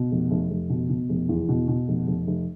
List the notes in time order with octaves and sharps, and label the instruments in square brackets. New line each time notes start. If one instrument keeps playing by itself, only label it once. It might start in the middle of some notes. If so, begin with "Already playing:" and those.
Already playing: [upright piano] B2
F1
F1
F1
B2
B2
F1
E2
B2
B2
F1
F1
F1